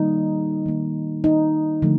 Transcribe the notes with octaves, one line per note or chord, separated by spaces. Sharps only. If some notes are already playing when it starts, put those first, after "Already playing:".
Already playing: D#3 G3 A#3 D#4
D#3 A#3
D#4
D3 F3 A3